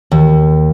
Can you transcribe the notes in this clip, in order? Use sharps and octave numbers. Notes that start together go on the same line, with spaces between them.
D#2